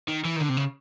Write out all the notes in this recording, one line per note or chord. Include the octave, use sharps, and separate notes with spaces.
D#3
E3
D#3
D3
C3
C#3